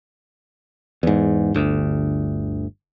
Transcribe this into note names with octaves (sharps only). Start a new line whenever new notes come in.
E2 G#2
G1 D2